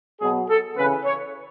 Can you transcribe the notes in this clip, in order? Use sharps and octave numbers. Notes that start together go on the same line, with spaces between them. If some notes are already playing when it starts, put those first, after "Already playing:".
B2 F#3 G#4
A4
C#3 E3 B4
C#5